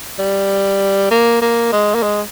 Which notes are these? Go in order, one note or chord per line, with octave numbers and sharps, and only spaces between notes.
G3
A#3
A#3
G#3
A#3
G#3